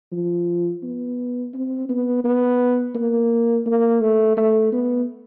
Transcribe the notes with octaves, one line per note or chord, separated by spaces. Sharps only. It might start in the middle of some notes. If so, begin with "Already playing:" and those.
F3
B3
C4
B3
B3
A#3
A#3
A3
A3
B3